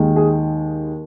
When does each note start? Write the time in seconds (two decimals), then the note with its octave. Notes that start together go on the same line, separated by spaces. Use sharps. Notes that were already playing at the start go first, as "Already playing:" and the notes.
Already playing: D#2 D#3 G#3
0.16 G#4